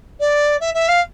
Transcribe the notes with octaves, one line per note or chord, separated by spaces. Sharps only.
D5
E5
E5
F5